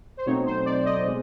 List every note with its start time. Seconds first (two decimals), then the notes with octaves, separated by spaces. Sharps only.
0.17 C5
0.26 B2 F#3 A3 C4 D#4 C#5
0.46 C5
0.65 D5
0.85 D#5
1.06 B2 G#3